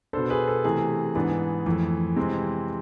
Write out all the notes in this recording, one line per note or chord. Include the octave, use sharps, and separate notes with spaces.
B2 B3 D4 A4 C5
G#4 B4
A4
C3 E3 A3 G#4
G#2 E3 B3 D4
F2 E3 A3
C3 E3 G#3 C4